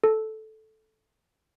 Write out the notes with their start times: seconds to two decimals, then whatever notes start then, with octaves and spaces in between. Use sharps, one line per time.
0.04 A4